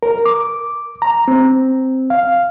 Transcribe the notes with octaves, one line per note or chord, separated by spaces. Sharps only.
A#4
D6
A#5
C4
F5